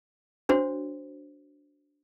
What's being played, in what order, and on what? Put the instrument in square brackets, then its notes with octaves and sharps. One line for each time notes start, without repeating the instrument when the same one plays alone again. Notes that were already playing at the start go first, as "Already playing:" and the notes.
[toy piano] D4 F#4 C5 C#5